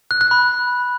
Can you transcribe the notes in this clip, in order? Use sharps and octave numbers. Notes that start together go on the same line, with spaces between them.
F#6
F#6
B5